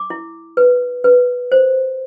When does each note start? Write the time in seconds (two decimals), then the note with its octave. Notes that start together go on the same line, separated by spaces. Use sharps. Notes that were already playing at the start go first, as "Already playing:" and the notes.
Already playing: D6
0.10 E4
0.57 B4
1.04 B4
1.52 C5